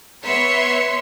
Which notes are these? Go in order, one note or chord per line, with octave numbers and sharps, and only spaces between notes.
B3 B4 C#5 E5 C6 C#7